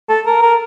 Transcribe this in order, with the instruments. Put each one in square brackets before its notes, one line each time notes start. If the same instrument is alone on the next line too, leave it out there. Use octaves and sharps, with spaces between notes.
[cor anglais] A4
A#4
A#4